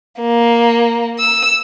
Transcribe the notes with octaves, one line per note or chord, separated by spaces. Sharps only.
A#3
E6